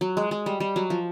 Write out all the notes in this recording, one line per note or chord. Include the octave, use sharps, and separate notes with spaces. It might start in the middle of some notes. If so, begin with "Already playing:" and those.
F#3
G#3
G#3
G3
G3
F#3
F3